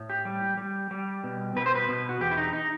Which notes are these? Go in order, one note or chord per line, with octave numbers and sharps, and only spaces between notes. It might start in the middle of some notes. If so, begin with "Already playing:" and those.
Already playing: A2
G4
G3
G3
G3
B2
B2 B4
C5
B4
B2
F#4
E2 G4
E4
D#4
D#4